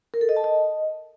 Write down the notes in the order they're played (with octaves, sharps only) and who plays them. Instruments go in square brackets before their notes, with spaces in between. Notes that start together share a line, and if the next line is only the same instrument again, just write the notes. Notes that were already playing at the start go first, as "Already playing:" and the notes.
[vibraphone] A#4
A4
D#5
A5
D#5